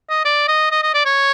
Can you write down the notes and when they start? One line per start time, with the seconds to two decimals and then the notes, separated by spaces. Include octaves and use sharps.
0.10 D#5
0.25 D5
0.48 D#5
0.71 D#5
0.83 D#5
0.94 D5
1.05 C#5